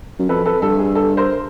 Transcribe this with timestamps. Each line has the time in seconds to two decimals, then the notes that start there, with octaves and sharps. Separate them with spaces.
0.19 F#2
0.29 F2 A4 B4
0.46 A4 B4
0.62 G2 A4
0.79 G#4
0.95 A4
1.17 A#4 C5